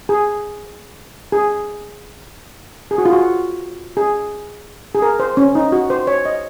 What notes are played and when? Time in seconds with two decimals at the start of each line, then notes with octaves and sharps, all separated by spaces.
0.09 G#4
1.32 G#4
2.91 G#4
2.98 F#4
3.05 F4
3.13 F#4
3.97 G#4
4.95 G#4
5.02 A#4
5.20 C5
5.37 C#4
5.55 D#4
5.72 F#4
5.90 C5
6.07 C#5
6.25 D#5